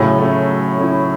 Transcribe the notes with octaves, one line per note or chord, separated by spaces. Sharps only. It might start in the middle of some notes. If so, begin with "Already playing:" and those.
Already playing: A2 C#3 F#3
A3 C#4 E4
F#3
A3 C#4 E4